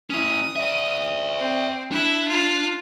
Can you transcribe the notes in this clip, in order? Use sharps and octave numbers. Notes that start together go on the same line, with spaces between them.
C#4 E4 D#6
D5 E5
C4
D4 E4 E5
F4